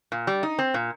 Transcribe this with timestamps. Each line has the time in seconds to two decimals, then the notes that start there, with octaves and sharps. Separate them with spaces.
0.12 A#2
0.27 G3
0.43 D#4
0.59 C4
0.74 A#2